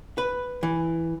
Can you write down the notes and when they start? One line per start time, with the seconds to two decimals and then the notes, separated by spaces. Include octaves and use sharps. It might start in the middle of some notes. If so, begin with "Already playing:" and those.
0.18 B4
0.63 E3